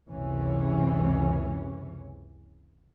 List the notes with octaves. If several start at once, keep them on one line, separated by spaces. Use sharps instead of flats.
F#1 C#2 C3 E3 C#4